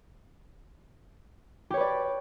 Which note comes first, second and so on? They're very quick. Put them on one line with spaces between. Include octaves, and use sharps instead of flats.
G4 C#5 B4 D5